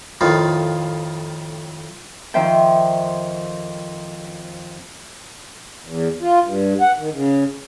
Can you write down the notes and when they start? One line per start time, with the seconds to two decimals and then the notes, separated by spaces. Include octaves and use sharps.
0.21 F2 A2 D#3 F4
2.34 F2 D#3 F3 C5 E5 G5
5.84 E2
6.21 F4
6.45 G2
6.81 F#5
6.98 D#3
7.12 C#3